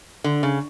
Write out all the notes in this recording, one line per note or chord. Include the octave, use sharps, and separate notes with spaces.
D3
C#3